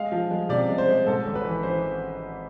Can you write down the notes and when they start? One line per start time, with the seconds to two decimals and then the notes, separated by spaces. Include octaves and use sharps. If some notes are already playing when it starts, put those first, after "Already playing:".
Already playing: G#3 F5
0.12 F3
0.31 G#3
0.49 C3 D5
0.69 G#3
0.78 C5
0.88 G#3
1.06 G#2 A4
1.26 G#1
1.35 B4
1.45 E3
1.63 E3 C5